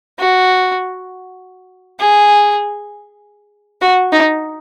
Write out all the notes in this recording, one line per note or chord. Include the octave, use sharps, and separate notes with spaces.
F#4
G#4
F#4
D#4